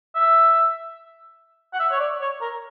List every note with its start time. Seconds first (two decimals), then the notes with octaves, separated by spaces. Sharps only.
0.15 E5
1.73 F#5
1.79 E5
1.91 C#5
2.00 D5
2.21 C#5
2.41 A#4